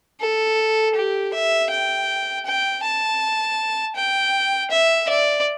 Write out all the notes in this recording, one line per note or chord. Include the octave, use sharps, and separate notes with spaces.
A4
G4
E5
G5
G5
A5
G5
E5
D5